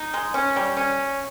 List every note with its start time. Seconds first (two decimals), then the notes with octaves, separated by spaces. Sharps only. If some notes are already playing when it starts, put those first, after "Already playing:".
Already playing: D#4
0.14 G#3
0.34 C#4
0.56 G3
0.77 C#4